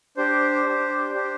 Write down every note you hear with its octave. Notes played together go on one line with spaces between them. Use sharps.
D4 G4 C5
D4 G4
D4 G4